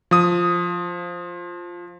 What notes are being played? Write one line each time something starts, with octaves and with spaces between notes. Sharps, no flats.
F3 D#6